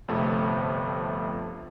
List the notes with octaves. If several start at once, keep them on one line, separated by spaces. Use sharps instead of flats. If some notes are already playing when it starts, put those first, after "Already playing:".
G1 F2 C3 F3 A3